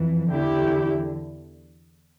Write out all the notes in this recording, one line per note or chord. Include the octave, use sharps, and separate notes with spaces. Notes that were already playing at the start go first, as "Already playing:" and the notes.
Already playing: F2 E3
E2 D3 E4 G4